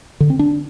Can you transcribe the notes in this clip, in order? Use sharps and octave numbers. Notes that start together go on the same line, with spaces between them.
D3
C4
D4